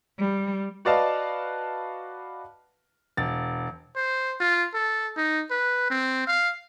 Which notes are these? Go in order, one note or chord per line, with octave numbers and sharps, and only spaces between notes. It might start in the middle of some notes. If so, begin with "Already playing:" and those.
G3
F#4 B4 D5 D#5 F5 A5
E1 A6
C5
F4
A4
D#4
B4
C4
F5